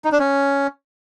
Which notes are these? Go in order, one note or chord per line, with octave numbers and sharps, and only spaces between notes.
D#4
D4
C#4